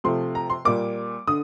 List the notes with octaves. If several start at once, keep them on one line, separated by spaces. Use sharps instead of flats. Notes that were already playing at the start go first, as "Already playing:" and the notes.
C3 F3 A3 C6
A#5
C6
A#2 G3 A#3 D6
D3 D#6